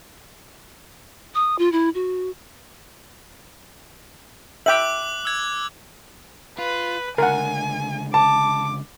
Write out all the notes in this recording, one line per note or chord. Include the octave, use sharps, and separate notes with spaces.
D#6
F4
E4
F#4
E5 G5 D6 F#6 F#7
E6 G#6
F4 B4
C#2 D3 A#4 F#5 G#5
A5 D6